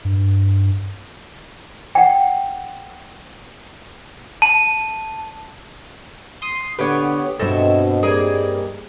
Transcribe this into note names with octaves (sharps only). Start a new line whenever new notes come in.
G2
F#5 G5
A5
C6 D#6
D3 B3 G4 B4 C#5
G2 B2 C4 A4 C#5 D#5 E5
G3 A#3 G#4 A#4